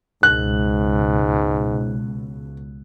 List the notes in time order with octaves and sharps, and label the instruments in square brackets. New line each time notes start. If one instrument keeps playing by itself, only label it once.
[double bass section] C#2 B2 [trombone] G#2 [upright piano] F#6